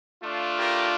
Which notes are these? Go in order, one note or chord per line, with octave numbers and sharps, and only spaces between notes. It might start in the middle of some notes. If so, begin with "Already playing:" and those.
A3 D4 F4
G4 A#4